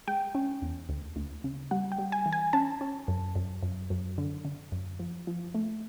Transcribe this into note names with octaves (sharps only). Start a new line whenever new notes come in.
G#3 G5
C#4
E2
D2
D2
C#3
G3 F#5
G5
G3
G#5
E3
G#5
C#4 A5
C#4
F#2
F#2
F#2
F#2
D3
D3
F#2
F3
F3
A3